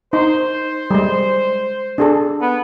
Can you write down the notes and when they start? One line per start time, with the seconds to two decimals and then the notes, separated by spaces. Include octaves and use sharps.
0.13 D#4 C5
0.91 G3 G#3
1.98 D4 G#4 A4
2.41 B3